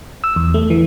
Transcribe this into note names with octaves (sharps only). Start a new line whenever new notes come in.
E6
E2
A3
E3